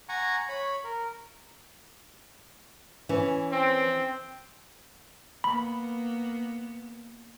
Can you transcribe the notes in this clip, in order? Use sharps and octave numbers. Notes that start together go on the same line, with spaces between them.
F#5 G#5 A#5 C#6
C#5 B5
A#4
E3 C#4
C4
A#3 B3 B5